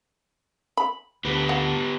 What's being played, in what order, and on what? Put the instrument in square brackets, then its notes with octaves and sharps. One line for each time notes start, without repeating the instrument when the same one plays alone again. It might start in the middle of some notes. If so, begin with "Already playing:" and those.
[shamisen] B5
[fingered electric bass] D2 [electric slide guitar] B3 G4 B4
[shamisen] F#5